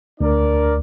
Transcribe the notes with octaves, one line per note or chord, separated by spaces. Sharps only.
D2 D4 A#4 D5